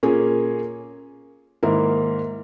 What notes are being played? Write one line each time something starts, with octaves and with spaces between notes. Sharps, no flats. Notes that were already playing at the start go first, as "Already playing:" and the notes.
A#2 A#3 C#4 G#4
G#2 D#3 A#3 E4 A#4